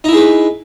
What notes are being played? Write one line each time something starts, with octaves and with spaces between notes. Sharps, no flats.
D#4 E4 G#4 B4